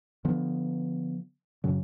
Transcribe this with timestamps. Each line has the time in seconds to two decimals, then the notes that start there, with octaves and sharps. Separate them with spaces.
0.25 D3 F3 B3
1.64 F#2 C#3 F#3